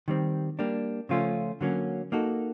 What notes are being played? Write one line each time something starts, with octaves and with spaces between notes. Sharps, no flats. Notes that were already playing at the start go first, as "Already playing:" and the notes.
D#3 G3 C4
G3 A#3 D4
C#3 F3 A3 C#4 F4
D3 F#3 A#3 C#4
A#3 D#4 F#4 A4